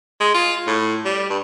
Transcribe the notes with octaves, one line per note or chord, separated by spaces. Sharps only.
G#3
F4
A2
G3
G2